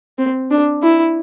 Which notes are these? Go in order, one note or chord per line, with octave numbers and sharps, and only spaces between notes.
C4
D4
E4